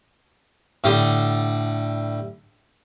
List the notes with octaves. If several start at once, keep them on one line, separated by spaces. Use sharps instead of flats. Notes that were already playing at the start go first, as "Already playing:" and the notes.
A2 D3 G3 D#6